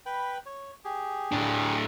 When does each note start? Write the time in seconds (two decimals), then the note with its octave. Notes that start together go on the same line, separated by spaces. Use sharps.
0.06 B4 G5 B5
0.46 C#5
0.85 G4 G#4
1.32 A2 D4